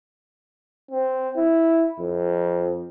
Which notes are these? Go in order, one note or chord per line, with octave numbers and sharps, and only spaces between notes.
C4
E4
F2